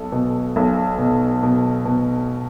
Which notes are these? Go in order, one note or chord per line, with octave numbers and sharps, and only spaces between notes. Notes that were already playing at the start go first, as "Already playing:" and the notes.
Already playing: B1 A4
B2
B1
B2
B2
B2